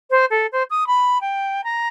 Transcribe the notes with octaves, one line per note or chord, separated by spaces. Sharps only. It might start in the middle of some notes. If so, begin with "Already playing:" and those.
C5
A4
C5
D#6
B5
G5
A#5